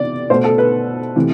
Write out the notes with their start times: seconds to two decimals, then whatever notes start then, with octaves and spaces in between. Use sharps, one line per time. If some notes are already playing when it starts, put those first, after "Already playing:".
Already playing: C3 E3 B3 D5
0.30 B2 A3 C5
0.44 A4
0.58 B4
1.16 C3 E3 A3